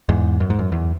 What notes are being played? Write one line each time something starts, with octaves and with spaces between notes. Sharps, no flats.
E2 G#2
F#2
G#2
F#2
E2